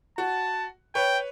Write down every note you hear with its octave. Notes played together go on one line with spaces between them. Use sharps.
F#4 A5
B4 C#5 G5